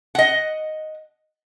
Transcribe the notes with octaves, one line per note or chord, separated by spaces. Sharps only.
D#5 F#5